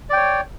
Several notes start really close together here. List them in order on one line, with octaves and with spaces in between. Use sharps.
D5 G5 C#5